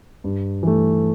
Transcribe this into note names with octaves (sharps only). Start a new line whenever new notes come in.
G2
E3 A3